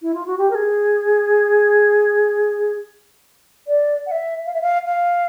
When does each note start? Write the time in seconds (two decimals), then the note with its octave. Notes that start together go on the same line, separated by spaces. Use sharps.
0.01 E4
0.14 F4
0.26 F#4
0.37 G4
0.50 A#4
0.54 G#4
3.67 D5
4.06 F#5
4.11 E5
4.45 F5
4.53 E5
4.61 F5
4.85 F5